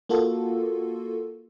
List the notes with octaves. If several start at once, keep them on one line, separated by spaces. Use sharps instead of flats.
A#3 F4 F#4 A4